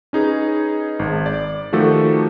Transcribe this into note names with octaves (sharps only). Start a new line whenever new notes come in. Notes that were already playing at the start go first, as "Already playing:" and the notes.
C#4 D#4 G#4 B4
G#1
D5
D#3 F3 A3 F#4 G4 A4